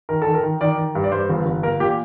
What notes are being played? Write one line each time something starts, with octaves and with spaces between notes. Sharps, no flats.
D#3 A#4
D#3 A4
A#4
D#3
D#3 D5
D#3
G2
D5
G2 C5
G1
G1
A#3 A#4
A#2 G4